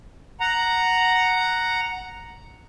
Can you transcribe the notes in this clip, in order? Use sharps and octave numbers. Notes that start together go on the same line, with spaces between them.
F#5 A#5